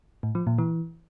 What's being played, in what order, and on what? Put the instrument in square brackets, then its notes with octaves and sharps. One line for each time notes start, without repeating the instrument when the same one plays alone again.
[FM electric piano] A2
F3
A#2
E3